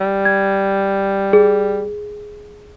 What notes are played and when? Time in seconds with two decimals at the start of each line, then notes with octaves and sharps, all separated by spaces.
0.01 G3
0.25 G#6
1.33 G#4